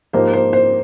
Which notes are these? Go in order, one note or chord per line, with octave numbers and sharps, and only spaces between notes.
G#2 F3 A#3 D#4 G4 C5
C5
C5